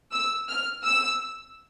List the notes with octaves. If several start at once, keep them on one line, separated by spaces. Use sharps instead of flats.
E6
F6
E6